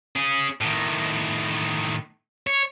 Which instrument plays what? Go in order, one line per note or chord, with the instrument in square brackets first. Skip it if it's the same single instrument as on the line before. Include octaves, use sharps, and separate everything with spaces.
[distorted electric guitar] C#4 G#4
A2 D#3
C#5